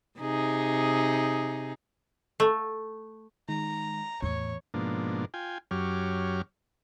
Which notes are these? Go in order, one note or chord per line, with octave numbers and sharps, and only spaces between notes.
C3 D#4 G#4
A3
D#3 G#3 D#4 A#5
E2 A2 C#5
G#2 B2 F3 A#3 D4
F4 G5 G#5
F#2 F#3 G4 C#5 D6 F6